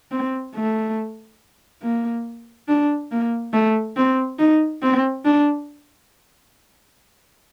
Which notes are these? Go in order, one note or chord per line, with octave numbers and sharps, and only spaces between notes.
C4
A3
A#3
D4
A#3
A3
C4
D#4
C4
D4